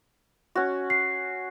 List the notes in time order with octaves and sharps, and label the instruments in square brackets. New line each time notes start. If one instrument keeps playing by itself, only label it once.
[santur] C#4 F#4
[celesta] C7